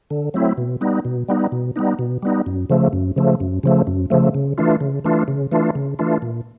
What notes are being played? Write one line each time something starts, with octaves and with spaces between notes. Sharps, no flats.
D3
F#3 A3 C4 E4
B2
G3 B3 D#4
B2
G3 B3 D#4
B2
G3 B3 D#4
B2
G3 B3 D#4
F#2
C#3 F3 A3
F#2
C#3 F3 A3
F#2
C#3 F3 A3
F#2
C#3 F3 A3
C#3
E3 A3 D4 F4
C#3
E3 A3 D4 F4
C#3
E3 A3 D4 F4
C#3
E3 A3 D4 F4
A#2